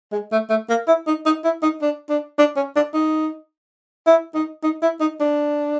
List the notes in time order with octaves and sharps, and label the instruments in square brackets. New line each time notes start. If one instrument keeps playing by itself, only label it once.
[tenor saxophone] G#3
A3
A3
A#3
E4
D#4
D#4
E4
D#4
D4
D4
D4
C#4
D4
D#4
E4
D#4
D#4
E4
D#4
D4